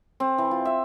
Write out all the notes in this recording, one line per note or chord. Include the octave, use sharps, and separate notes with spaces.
C4
E3
F4
E5